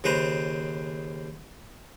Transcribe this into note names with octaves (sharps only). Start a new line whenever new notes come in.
D#2 C#3 B4 C5 A#5